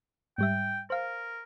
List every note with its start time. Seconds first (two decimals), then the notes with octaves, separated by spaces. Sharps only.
0.38 G#2 G3 E5 G5
0.90 A#4 C5 F5